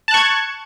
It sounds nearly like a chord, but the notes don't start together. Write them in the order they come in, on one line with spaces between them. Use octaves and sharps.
A5 F#6 C#6 G#6